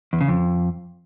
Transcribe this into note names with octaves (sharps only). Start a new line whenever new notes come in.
E2
C#3
F2